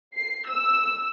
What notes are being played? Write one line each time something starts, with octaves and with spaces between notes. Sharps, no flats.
C7
E6